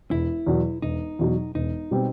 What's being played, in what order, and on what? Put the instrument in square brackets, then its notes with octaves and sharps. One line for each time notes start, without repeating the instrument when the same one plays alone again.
[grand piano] E1 [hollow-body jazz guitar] E4
[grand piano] E2 B2 F#3
[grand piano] E1 [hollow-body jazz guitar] D#4
[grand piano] E2 B2 F#3
[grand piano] E1 [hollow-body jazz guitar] D#4
[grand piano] B2 G3 C4